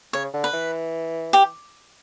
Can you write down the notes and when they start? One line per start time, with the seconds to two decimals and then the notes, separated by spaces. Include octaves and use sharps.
0.13 C#3 C#5
0.34 D3
0.44 B4
0.54 E3
1.33 G4